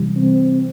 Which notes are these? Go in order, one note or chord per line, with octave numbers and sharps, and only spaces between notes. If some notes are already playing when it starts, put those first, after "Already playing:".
Already playing: C3 E3 G3
C4